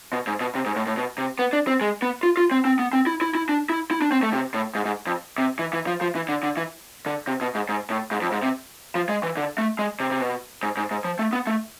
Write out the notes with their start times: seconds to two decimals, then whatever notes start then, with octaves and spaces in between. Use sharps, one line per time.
0.13 B2
0.27 G#2
0.41 B2
0.55 C3
0.66 G#2
0.76 A2
0.87 A2
0.97 B2
1.18 C3
1.39 B3
1.53 D4
1.67 C4
1.81 G#3
2.02 B3
2.23 F4
2.37 F4
2.51 C4
2.65 C4
2.79 B3
2.93 C4
3.07 E4
3.21 E4
3.35 E4
3.49 D4
3.70 E4
3.91 E4
4.02 D4
4.12 C4
4.23 A3
4.33 C3
4.54 A2
4.75 G#2
4.85 G#2
5.07 F2
5.38 C3
5.59 E3
5.73 E3
5.87 F3
6.01 F3
6.15 E3
6.29 D3
6.43 D3
6.57 E3
7.06 D3
7.27 C3
7.41 B2
7.55 G#2
7.69 G#2
7.90 A2
8.11 G#2
8.22 F2
8.32 G#2
8.43 C3
8.95 F3
9.09 G#3
9.23 E3
9.37 D3
9.58 A3
9.79 G#3
10.00 C3
10.11 C3
10.21 B2
10.63 G#2
10.77 G#2
10.91 G#2
11.05 F3
11.19 A3
11.33 B3
11.47 A3